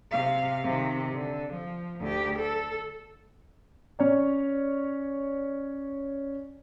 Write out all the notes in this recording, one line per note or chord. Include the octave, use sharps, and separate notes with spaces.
C3 F5
C3 D#3
D3
F3
D2 G4
A4
C#4 C#5 D5